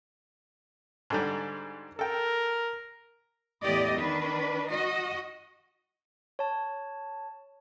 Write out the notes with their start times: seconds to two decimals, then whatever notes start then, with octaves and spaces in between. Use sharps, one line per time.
1.10 G#2 D3 G3
1.99 A4 A#4 G5
3.63 E2 A2 G4 D5 D#5
3.95 D#3 D4 B4
4.69 F#4 D#5
6.39 C#5 A5